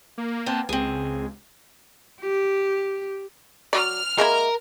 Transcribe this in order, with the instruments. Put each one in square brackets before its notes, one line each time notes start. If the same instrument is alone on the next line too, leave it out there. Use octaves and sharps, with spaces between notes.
[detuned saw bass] A#3
[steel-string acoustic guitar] B3 C4 A5
[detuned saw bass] C#2 [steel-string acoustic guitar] C4 G#4
[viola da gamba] G4
[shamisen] F#3 D5 [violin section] F6
[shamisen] G#3 A#3 E4 [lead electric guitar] A#4